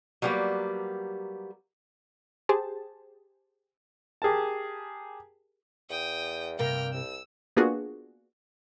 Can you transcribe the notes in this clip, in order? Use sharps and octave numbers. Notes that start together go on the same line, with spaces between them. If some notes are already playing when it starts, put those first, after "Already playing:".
F#3 G3 A#3 B3 G4
G4 G#4 C5 A5
G4 G#4 A#4 A5
E2 G5 D#6
G2 C3 A#3 A#4 G5 F6
C2 E6
A#3 B3 D4 F4 F#4 G#4